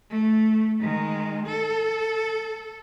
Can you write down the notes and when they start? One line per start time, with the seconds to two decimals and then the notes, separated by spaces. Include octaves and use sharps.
0.10 A3
0.81 D#3 G#3
1.46 A4